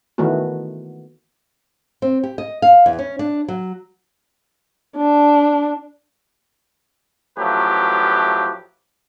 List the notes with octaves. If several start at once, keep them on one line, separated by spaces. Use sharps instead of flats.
D#3 E3 A3 B3 F#4
C4
G4
D#5
F5
E2
C#4
D4
F#3
D4
A1 F3 F#3 A3 G4 B4